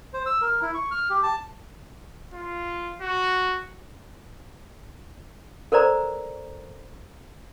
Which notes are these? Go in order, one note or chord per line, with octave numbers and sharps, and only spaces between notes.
C5
E6
A#4
E4
C#6
F6
G4
A5
F4
F#4
A4 A#4 C5 D5 A#5